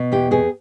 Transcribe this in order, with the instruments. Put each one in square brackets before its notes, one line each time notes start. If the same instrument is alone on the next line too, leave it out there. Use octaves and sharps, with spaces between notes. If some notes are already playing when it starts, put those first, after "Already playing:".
Already playing: [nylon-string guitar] B2
E2 G4
E2 G#4